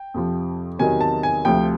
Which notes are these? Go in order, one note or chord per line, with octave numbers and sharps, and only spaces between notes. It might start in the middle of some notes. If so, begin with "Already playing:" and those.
Already playing: G5
F2 C3 F3
E2 C3 D#3 F#3 G#5
A5
G#5
D2 C3 F3 G5